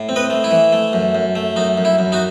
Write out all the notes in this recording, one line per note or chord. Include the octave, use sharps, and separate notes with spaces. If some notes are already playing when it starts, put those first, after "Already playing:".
Already playing: A2
C4
B4 D#5
A3
E4
E3
A3
F#2
F#2
A3
F#2 D#4
F#2
E4
F#2
D#4 F#4